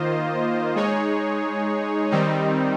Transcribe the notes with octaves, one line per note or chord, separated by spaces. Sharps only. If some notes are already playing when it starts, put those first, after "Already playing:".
Already playing: D#3 A#3 F4 C5 D#5
G#3 D#4 G#4 C#5
D#3 G3 C4 D#4